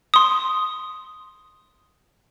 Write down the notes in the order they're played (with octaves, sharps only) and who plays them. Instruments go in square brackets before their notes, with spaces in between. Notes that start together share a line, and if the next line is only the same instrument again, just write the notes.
[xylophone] C6 D#6